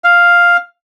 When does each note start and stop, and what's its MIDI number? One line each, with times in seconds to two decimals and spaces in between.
0.04 0.57 77